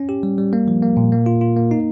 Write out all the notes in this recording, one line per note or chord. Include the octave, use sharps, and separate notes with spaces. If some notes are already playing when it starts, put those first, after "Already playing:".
Already playing: C#4
G4
G3
G3
A#3
F3
A#3
A#2
A#3
F4
F4
A#3
D#4